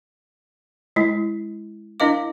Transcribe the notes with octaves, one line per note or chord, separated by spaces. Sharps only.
G#3 E4
D4 E4 A#4 D#5 F5 D6